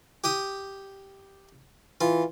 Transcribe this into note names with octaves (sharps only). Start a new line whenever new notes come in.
G4 G5 D#6
E3 F4